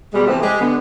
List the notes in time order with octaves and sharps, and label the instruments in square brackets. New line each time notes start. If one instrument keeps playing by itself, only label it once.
[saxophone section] B2 G3 G#3
C3 E3 F3 A3 B3 C4
G#3 G4
D3 B3